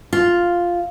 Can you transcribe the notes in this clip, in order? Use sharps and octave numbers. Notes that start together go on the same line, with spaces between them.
F4